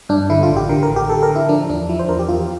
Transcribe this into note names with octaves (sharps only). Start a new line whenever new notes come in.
G2 D4
D3 E4
F4
A1
G4
D3 A#4
A#4
A1
G4
D3 A4
A#4
D3
E4
F3 D4
E2 D4
F3 E4
C5
E2 A#4
G4
E2 F4